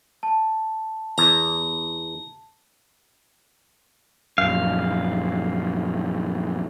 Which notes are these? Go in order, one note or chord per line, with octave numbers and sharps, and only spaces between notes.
A5
E2 A#5
A#1 F#2 F5